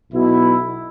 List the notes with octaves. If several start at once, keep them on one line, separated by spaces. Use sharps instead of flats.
B1 B2 B3 E4